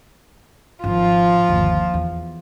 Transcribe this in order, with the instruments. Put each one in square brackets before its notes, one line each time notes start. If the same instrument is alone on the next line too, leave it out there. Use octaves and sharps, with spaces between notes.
[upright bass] G#1 C#4 [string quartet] F3 F4
[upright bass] G1 D#2
E2